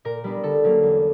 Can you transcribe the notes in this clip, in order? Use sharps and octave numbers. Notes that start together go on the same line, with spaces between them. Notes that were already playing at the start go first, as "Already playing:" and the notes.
A#2 A#4
G3 B3 D4
D3 A4
F#3 A#3 C#4
E2